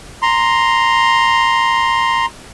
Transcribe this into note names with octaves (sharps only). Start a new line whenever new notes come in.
A#5 C6